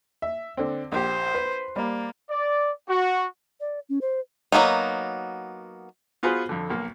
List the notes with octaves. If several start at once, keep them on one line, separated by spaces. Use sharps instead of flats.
E5
D3 C4
A#1 G4 C5
B4
G3 A#3
D5
F#4
D5
C#4
C5
F#3 A#3 B3 D#4
B3 F4 F#4 G#4 B4 C5
F2 D3
B1 A#3